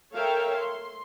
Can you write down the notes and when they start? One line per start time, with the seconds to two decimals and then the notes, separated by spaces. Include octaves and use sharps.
0.14 A4 A#4 C#5 E5 F5 G5
0.57 C6